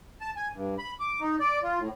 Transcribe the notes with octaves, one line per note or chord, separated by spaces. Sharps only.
A5
G#5
G2
B5
D6
D#4
D5
F4
A2